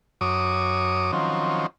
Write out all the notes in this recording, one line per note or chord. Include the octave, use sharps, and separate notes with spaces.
F#2 C#5 D6 D#6
D#3 F3 F#3 C4 C#4